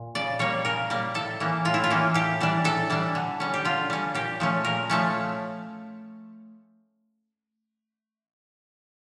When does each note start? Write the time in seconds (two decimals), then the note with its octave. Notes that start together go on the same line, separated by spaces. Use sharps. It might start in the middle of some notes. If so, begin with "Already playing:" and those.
Already playing: A#2
0.15 C#3 D5
0.39 G3 A#3 C#5
0.65 C#3 A#4
0.90 G3 A#3
1.14 A2 A4
1.40 E3 A#3 C#4
1.65 A2 F4
1.74 E4
1.84 F4
1.90 E3 A#3 C#4
2.14 A2 G4
2.41 E3 G3 D4
2.64 A2 A4
2.90 E3 G3 D4
3.15 D3
3.40 G3 C#4
3.54 G4
3.65 D3 F4
3.90 G3 C#4
4.15 A#2 G4
4.40 F3 A3 C#4
4.65 A#2 A#4
4.90 F3 A3 C#4